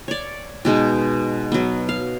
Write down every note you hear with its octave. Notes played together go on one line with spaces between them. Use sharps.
C#5 D5
B2 G#3 D#4
F#3 B3
F5